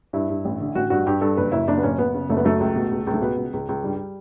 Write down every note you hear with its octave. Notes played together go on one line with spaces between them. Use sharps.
G2 E4
G2
A1
D3
A1 F#4
G2 F#4
G2 G4
G2 A4
F#1 B4
F#1 E4
F#1 D4
B3
F#1 C#4
F#1 B3
C#3
F#1 A3
B3
F#2 A3
C#2
B2
C#2
C#2
A3
B2 B3
C#2
C#2
C#2
G2 G3